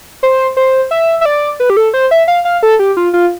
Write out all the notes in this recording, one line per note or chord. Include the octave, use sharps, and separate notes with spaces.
C5
C5
E5
E5
D5
B4
G4
A4
C5
E5
F5
F5
A4
G4
F4
F4